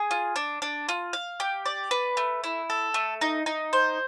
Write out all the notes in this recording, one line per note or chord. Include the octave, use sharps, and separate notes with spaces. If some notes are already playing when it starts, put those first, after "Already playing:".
Already playing: G#4
F4
D4
D4
F4
F5
G4
D5
B4
A3
E4
A4
A3
D#4
D#4
C5